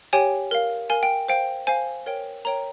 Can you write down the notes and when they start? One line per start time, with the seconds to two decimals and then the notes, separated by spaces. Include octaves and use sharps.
0.13 G4 C#5 G5 G#5
0.51 A#4 F5
0.89 A#4 F5 G#5
1.03 G5
1.28 C5 F5 G5
1.67 C5 F5 G#5
2.06 A#4 C#5 G5
2.45 A#4 C#5 G5 A#5